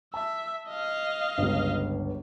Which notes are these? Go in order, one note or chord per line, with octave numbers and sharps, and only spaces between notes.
E5 A5
D#5 F5
G1 C#2